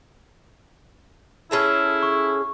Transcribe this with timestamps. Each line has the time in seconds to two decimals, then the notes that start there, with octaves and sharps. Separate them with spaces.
1.51 C#4 E4 G#4 A4
2.03 C#6